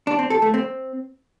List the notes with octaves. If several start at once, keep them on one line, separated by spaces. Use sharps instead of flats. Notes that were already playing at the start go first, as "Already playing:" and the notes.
D4
C4
A4
A3
C4